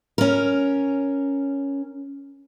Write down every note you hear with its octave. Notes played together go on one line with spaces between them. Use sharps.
C#4 A#4